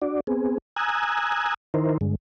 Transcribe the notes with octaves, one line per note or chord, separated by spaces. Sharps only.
D4 F#4 D5
B3 C4 G#4
G#5 A#5 D#6 E6 F#6 G#6
D#3 D#4 E4 A#4 C5
G2 D3 G#3